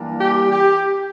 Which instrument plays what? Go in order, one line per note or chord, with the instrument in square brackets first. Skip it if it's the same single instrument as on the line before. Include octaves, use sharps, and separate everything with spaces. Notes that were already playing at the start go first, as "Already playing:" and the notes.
Already playing: [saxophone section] E3 G3 A#3 D4
G4
G4